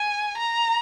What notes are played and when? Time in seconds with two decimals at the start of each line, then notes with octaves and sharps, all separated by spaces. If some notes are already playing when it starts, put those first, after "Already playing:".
Already playing: G#5
0.38 A#5